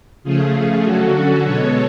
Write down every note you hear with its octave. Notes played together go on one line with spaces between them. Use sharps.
C#3 F3 A3 F4 G#4
D3 F#3 C#4 F#4 A4
B2 G#3 B3 A4 C#5